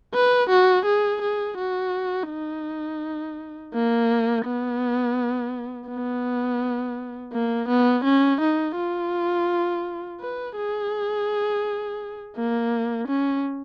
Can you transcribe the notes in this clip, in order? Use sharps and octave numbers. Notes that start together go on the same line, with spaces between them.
B4
F#4
G#4
G#4
F#4
D#4
A#3
B3
B3
A#3
B3
C#4
D#4
F4
B4
G#4
A#3
C#4